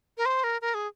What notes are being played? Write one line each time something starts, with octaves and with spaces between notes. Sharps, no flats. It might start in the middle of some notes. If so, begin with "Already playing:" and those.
A#4
C5
A#4
A#4
G#4